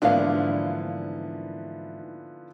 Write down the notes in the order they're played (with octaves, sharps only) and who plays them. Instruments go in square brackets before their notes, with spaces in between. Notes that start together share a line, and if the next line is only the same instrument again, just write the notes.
[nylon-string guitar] G#2 E3 A#3 [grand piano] D3 F3 B3 [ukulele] D4 F5